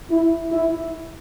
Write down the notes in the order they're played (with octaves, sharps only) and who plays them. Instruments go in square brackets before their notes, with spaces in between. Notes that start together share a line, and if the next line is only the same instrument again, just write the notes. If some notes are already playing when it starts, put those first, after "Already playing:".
[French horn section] E4
E4